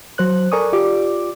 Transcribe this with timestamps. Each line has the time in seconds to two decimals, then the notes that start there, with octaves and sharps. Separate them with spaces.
0.18 F#3 C5 F#6
0.52 A4 A#4 D5 G#5 C#6 D#6
0.73 F4 G4 D5 D6